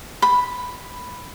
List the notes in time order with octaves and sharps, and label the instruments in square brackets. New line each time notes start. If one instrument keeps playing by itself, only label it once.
[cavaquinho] B5